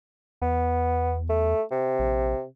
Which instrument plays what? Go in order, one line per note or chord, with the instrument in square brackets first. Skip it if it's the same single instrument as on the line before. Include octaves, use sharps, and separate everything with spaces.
[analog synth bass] E2 [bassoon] B3
[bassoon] A3
C3
[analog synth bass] A#1